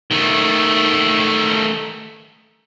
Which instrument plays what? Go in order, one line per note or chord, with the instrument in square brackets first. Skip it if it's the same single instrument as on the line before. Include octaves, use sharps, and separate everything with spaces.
[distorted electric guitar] D#3 A3